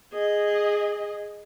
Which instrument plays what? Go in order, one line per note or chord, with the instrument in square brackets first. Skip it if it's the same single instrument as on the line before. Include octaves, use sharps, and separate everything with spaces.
[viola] G#4 D#5